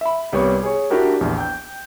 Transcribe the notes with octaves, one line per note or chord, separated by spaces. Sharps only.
E5 B5
C2 G3 B3 C#5 D6
G#4 C#5
D4 E4 F#4 G4 A#4
A#1 E2
G5 G6